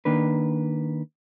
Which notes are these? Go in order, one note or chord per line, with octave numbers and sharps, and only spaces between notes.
D#3 A#3 D4 B4